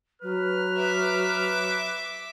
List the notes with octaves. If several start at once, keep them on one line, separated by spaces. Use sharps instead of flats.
F#3 B4 F6
E5 D6